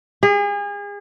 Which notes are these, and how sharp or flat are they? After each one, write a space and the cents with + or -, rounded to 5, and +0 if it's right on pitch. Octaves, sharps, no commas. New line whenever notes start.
G#4 -35